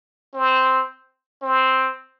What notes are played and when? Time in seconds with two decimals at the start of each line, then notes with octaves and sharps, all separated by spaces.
0.33 C4
1.42 C4